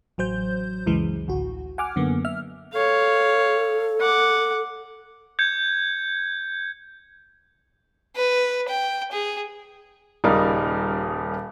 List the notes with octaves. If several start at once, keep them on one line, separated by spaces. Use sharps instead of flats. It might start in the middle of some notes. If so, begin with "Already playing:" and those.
A1 F#3 C5 G6
C#2 F#2 E3 G#3
A1 D2 F#4
F#5 G#5 D6 F6
F#2 D3 A#3 B3
E5 F6
A4 C#5 F5
F#5 D6
G6 G#6 C#7
B4
G5
G#4
D#1 C#3 G3 D#4 A#4